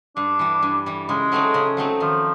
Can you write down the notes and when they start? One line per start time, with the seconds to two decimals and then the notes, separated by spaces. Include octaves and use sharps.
0.16 G2 D4
0.39 E3 G3
0.63 G2
0.86 E3 G3
1.09 C#3 G#3
1.32 F#3 A3 C4 D#4
1.54 C#3
1.77 F#3 A3 C4 D#4
2.00 D#3 F3